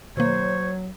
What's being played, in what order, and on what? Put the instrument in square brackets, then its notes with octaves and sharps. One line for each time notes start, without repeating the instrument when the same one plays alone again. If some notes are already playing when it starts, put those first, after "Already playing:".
[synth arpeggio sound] B2 D#3 A#3 [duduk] F#3 [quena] C5 [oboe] C#5